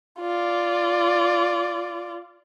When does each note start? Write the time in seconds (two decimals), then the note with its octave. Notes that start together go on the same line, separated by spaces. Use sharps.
0.20 F4 D5